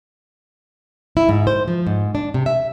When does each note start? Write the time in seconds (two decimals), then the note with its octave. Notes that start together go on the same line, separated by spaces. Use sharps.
1.17 E4
1.29 G#2
1.47 C5
1.68 F3
1.87 G#2
2.15 D4
2.34 C3
2.46 E5